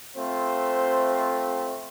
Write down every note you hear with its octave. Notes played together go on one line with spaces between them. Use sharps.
A3 C4 F4 C5